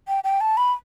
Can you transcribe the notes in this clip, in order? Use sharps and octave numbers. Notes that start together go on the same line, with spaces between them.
G5
G5
A5
B5